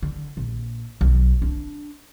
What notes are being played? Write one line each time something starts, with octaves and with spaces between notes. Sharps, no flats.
D3
A#1
B1
D4